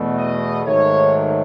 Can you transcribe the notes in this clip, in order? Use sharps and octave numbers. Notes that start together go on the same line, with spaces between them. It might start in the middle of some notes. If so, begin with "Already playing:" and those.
Already playing: E2 B2 A3
D#5
G#2 D#3 F#3 A3 C#5